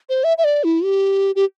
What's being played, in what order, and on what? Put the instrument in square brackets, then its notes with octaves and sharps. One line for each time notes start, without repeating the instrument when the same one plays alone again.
[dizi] C5
E5
E5
D5
E4
G4
G4